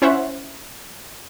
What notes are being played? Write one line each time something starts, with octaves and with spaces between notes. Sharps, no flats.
C#4 E4 C5 C#5 E5 F#5